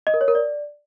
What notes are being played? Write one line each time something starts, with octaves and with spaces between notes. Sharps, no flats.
D#5
A#4
C#5
A#4
D5